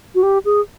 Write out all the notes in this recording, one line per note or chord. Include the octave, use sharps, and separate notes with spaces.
F#4
G4
G#4